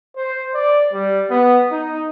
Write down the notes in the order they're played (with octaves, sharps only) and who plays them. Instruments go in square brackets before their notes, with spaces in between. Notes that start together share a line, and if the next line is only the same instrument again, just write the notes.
[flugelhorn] C5
D5
G3
B3
D#4